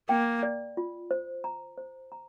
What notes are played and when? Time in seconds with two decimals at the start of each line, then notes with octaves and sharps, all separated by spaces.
0.09 A#3 G5
0.43 D5
0.77 F4
1.11 C5
1.44 A#5
1.78 C5
2.12 A#5